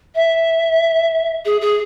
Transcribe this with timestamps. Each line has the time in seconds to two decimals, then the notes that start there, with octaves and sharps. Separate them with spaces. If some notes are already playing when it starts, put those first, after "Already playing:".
0.15 E5
1.45 G#4
1.61 G#4